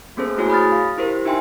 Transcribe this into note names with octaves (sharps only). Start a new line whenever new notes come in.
A#3 B3 C#4 G#4 A4 C5
A3 E4 F#4 G#4 C#5 G#5
B5 D#6 F6 A6
F5
E4 G4 A#4 C5
D#4 F4 E5 G5 G#5 C6